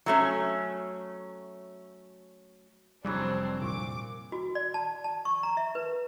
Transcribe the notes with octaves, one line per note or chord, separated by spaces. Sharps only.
F#3 A3 C#4
F1 C#3 E3 F#3 G3 C4 D4
A#2 C#6 D6
F#4
D5
A5
A5
C#6
A#5
E5
B4